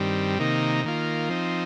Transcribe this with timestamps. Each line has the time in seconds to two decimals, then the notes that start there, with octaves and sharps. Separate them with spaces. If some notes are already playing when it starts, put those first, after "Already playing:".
Already playing: G2 D#3 G3 C4
0.39 C3 D#3 A#3 D#4
0.84 D#3 A#3 F4
1.29 F3 C4 D#4